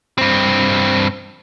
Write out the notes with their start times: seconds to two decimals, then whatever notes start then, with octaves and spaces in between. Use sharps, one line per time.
0.18 G2 C4